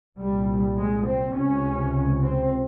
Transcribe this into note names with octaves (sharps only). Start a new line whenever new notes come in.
C2 A#2 G3
G#3
C4
C#2 C3 C#4
C4